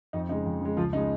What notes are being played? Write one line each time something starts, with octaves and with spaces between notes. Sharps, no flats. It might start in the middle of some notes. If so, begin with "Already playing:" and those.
F2 D#4
C#3 G#3 D#4
F2
C#3 G#3
C#2 F3 F4
C#3 G#3 D#4